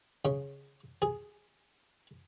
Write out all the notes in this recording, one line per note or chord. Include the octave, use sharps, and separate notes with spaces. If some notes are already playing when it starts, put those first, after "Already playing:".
C#3
G#4